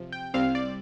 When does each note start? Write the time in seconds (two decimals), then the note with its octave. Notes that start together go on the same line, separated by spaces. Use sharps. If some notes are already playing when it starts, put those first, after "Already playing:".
Already playing: C3 F3
0.12 G5
0.34 C2 C3 G3 C4 F5
0.55 D5